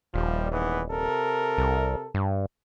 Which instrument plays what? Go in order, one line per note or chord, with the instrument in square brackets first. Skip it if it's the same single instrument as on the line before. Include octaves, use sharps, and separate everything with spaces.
[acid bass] D#1 [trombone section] F3 G3
[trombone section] G#2 E3 B3
C3 A4 A#4
[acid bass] C2
G2